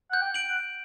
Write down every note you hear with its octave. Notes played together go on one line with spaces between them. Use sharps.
F#5 G6
G5
D7 F#7
F#5